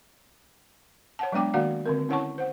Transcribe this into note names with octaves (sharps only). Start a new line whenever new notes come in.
C#5 F#5 A5
F#3 G#3 B3 D4 G5 D6
D#3 A#3 F#4 D5 F5 F#5
D3 C4 A#4
C#4 E4 C#5 F#5 A5 C#6
C5 F#5